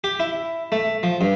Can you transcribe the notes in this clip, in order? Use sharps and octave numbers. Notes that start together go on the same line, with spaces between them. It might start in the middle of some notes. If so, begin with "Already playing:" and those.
G4
E4
A3
F3
G2